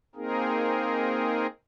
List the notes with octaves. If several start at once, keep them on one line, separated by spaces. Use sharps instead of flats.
A#3 C4 D#4 G#4 A#4